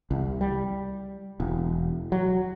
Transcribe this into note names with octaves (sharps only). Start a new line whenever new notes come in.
C2
G3
E1
F#3